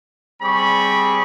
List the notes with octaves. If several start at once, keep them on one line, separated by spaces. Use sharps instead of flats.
G3 C4 G#4 B5 C#6